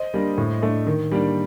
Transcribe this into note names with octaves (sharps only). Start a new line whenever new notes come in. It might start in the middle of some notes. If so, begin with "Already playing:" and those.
Already playing: C5 D#5
G3 A#3 D4
A2
A3 D4
D#3
G3 A#3 D4